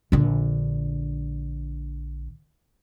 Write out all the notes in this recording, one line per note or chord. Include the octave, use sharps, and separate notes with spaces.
A#1 D3